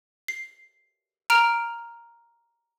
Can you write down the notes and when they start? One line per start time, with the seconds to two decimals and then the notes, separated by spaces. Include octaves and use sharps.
0.28 C7
1.30 A#5 F6 D7 F7